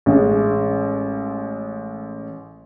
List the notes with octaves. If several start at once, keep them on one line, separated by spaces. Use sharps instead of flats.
A1 G#3